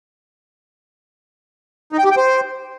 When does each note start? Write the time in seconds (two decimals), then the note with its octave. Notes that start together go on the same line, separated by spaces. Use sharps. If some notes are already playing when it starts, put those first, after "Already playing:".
1.92 D#4
1.98 G5
2.05 G4
2.11 G5
2.17 C5